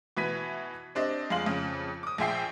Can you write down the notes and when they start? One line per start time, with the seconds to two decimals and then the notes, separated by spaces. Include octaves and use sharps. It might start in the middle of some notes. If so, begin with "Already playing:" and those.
0.17 B2 E3 B4 G#6 B6 D#7
0.95 C4 D4 G4 D#5
1.30 F2 G#3 F5 F#7
1.46 F2 C#3
2.03 D6 D#6
2.18 A#1 G#4 E5 G5 C7